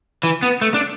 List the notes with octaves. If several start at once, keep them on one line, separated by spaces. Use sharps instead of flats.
E3
B3
A3
D4